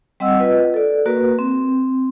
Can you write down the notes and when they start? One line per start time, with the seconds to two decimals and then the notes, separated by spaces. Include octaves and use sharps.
0.20 G3 C4 D#5 F#5 E6
0.40 F4 B4 D#5
0.74 A4 D5
1.06 A#3 F#4 A#4 B4
1.39 C4